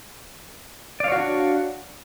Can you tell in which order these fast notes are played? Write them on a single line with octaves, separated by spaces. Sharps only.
D5 F5 C#5 F#4 D4